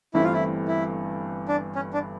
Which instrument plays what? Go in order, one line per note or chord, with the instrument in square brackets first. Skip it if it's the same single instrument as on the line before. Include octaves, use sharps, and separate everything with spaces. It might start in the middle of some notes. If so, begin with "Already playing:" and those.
[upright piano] G1 G2 E3 A3 C4 [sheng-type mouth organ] E4
[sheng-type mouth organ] F4
E4
E4
D4
C#4
D4